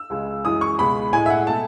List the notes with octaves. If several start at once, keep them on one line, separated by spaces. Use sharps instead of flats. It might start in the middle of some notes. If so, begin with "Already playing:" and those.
Already playing: E6
C#2 C#3 G#3
F#2 E3 G#3 D#6
C#6
C#2 B2 G#3 B5
A2 G#3 G#5
E5
F#5
B2 A3 A5